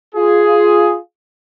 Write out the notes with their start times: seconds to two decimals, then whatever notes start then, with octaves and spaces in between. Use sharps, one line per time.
0.15 F4 G#4